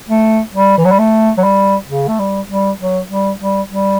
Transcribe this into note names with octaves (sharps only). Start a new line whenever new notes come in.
A3
G3
E3
F#3
G3
A3
F#3
G3
C#3
A3
G3
G3
F#3
G3
G3
G3